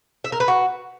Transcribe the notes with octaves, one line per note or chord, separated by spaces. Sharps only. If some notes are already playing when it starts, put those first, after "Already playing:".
E5
A#4
B4
F#4